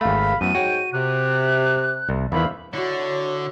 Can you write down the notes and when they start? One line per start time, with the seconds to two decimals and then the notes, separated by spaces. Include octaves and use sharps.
0.01 G#1 A3 F5 B5
0.41 F#2 E3 A3 B3 D#7
0.55 G#2 F#4 C#5 G5
0.93 C3 F#6
2.09 C2
2.32 E2 D#3 E3 C5 E5 F5 B5
2.74 D3 E4 F#4 C#5